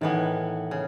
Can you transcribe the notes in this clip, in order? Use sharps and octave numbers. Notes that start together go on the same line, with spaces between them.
A2 D#3 E3 B3 D#4
C#3